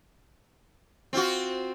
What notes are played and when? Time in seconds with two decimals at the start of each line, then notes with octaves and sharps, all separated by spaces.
1.13 C4 F4 F#4